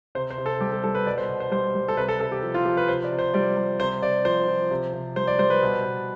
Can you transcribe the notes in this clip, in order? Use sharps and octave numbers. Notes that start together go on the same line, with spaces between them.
C3 C5
C5
C3
A4
G3 G4
A4
G3 A4
B4
B2 D5
C5
B2
C5
G3 C5
G3
A4
C3 B4
A4
C3 A4
G4
F3
F4
F3 G4
B4
C3 C5
D5
C3
C5
G3 D5
G3
C3 C5
C3 D5
F3 C5
F3
C3
C3
G3 C5
D5
G3 C5
B4
B2
B2